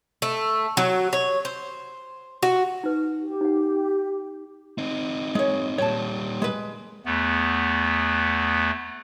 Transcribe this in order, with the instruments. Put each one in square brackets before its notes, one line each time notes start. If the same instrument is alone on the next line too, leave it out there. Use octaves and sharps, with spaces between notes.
[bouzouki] A3
F#3
C#5
C5
F#4
[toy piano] D#4 B4
[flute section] G4
[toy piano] D#4 F#5
[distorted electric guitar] C4 D#4
[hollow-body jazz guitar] G#3 C#5
[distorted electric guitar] A#2 G3 [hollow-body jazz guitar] C#5 A5
[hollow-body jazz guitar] G#3 B4
[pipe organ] E2 A3 B3